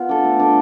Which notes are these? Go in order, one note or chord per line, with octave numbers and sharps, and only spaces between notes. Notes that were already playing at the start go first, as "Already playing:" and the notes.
Already playing: B3 F4
D4 A4
A3
D4 A4